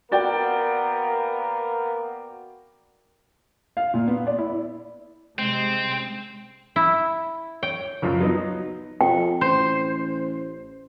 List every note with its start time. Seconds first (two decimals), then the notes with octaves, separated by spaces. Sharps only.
0.12 A#3 B3 F#4 A#4 D5 G5
3.77 F5
3.94 A#2
4.08 B3
4.27 D5
4.38 E4
5.39 C3 G3 G#3 C4
6.76 E4
7.63 C#5 G5
8.02 C#2 F#2 F3
8.20 F#3 B3 D#4
9.01 F2 G5
9.41 A1 C5